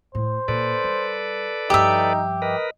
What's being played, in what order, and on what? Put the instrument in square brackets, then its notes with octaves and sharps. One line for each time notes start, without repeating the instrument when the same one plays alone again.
[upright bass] A2 [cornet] C5
[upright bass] A#2 [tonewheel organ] A4 B4 D5
[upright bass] G3
[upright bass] G2 F3 [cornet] D#4 [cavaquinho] G4 E5
[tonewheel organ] A#4 B4 [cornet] D#5